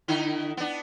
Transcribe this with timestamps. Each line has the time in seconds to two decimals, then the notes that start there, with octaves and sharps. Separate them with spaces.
0.08 D3 D#4 E4
0.57 B3 D4